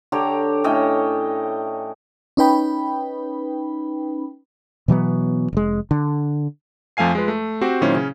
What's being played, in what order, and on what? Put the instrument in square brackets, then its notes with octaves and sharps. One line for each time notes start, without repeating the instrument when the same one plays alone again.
[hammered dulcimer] D3 G4 C#5 A#5
A2 C#4 D#5 G5
[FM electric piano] C#4 D#4 B4 G5 B5
[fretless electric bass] B2 E3 F#3 B3
F1 G#3
D3
[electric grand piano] F2 F3 A3 F5 G#5 C7
G#3 F4 B4
A3
C4 F#4 G4 C5
A#2 D#3 F#3 C#4 E4 C5
C#3 C#4